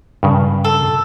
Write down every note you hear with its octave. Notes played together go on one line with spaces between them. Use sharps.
G2 C#3
A4